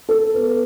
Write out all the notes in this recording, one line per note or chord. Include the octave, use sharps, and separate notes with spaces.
A4
B3